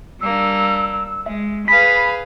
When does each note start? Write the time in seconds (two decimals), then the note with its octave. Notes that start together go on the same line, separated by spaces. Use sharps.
0.21 G3 A#3 D4 E6
1.26 G#3 E5
1.68 G#4 B4 F5 B5 B6